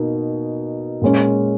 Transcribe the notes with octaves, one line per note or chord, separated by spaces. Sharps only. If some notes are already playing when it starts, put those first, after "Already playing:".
Already playing: B2 A#3 D#4
A#2 G#3 C#4